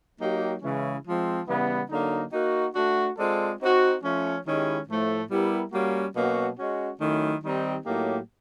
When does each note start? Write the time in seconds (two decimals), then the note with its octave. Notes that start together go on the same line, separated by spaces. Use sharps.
0.20 F#3 A#3 D#4 G4
0.63 C#3 E3 G#3 C#4 E4
1.05 F3 G#3 C4
1.48 C#3 E3 G3 B3
1.90 D3 F#3 A#3 D#4
2.33 A#3 D#4 F#4
2.75 A3 D4 F#4
3.18 G#3 C4 F4 A4 D5
3.60 C4 D#4 F#4
4.02 F3 A3 C#4
4.44 D#3 G#3 C#4 E4 G4
4.87 A2 F3 A3
5.29 G3 B3 E4 G4 A#4
5.72 G3 A#3 C#4 F#4
6.15 B2 F#3 A#3 C#4 F#4
6.57 G#3 C#4 F#4
7.00 D#3 F#3 A3 C#4 E4
7.43 D#3 G3 C4 D#4 G4
7.85 A2 F#3 A#3 D#4 G4